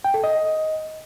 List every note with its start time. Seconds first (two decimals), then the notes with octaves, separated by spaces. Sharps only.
0.04 G5
0.14 A4
0.24 D#5